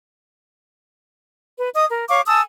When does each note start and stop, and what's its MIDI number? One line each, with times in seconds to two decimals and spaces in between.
1.58 1.69 71
1.75 1.85 75
1.75 1.85 87
1.90 2.05 70
2.09 2.21 73
2.09 2.21 77
2.09 2.21 85
2.09 2.21 86
2.26 2.41 80
2.26 2.41 81
2.26 2.41 87
2.26 2.41 88